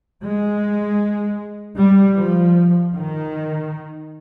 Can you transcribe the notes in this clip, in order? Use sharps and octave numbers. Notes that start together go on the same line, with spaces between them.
G#3
G3
F3
D#3